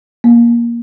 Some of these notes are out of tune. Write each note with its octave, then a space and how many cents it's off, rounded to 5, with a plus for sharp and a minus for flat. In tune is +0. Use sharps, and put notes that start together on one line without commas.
A#3 +15